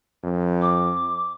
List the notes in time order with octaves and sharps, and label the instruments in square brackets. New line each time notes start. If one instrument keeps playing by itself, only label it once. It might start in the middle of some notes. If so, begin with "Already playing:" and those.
[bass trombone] F2
[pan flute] D6